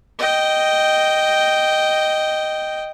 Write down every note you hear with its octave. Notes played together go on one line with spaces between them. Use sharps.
D#5 G5